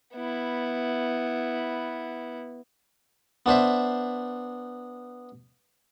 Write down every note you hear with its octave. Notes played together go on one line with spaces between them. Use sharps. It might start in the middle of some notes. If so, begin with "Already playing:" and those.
B3 E4
B3 D4 C5 E5